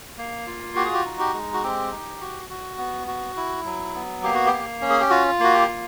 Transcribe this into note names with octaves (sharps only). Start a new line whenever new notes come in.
A#3
F4
F#4 G4
G#4
G4
D#4
G4
G#3
F#4
C4 G4
D#4
F#4
F#4
B3
F#4
E4
F#3
B3
A#3 G4
F#4
G4
A#3
C#4
G#4
G4
F4 F#4
A#3 F#4
G4
F4